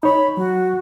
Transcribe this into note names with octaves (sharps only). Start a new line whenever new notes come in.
D#4 C#5 B5
F#3 F#4